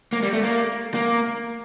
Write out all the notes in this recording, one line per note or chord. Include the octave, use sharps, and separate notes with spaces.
A#3
G3
A3
A#3
A#3